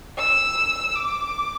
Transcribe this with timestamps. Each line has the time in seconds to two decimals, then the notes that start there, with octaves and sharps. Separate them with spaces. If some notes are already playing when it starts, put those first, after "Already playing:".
0.18 E6
0.96 D6